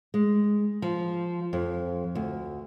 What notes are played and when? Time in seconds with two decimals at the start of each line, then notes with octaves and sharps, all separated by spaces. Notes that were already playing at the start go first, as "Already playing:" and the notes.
0.14 G#3
0.82 F3
1.53 F2
2.15 D2